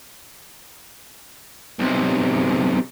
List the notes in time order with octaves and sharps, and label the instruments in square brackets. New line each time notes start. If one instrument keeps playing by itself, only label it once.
[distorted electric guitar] B1 C3